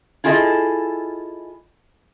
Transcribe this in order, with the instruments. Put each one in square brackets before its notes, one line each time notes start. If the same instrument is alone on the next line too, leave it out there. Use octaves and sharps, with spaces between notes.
[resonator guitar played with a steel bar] E4 F4 G#4 A4 D#5